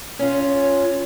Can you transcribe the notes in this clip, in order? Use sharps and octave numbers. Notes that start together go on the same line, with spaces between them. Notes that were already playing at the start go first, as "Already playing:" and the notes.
C#4 F4